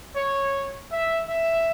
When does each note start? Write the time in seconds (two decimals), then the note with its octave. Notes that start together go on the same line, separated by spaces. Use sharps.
0.16 C#5
0.92 E5
1.29 E5